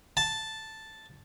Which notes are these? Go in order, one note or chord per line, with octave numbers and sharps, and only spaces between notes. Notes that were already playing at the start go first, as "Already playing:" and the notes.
A5